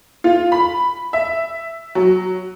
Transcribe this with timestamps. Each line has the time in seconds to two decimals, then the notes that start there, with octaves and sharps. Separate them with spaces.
0.24 F4
0.52 B5
1.13 E5
1.95 F#3